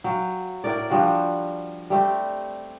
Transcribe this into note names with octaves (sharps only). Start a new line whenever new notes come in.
F#3 F5 G5
A2 A#4 D5
F3 G3 D4 F#4
G3 A3 C4